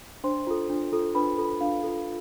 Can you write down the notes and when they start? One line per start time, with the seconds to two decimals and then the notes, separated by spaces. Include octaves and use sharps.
0.24 D4 C5 C6
0.47 F4 A4
0.70 D4
0.92 F4 A4
1.15 D4 B4 B5
1.38 F4 A4
1.61 D4 F5
1.83 F4 A4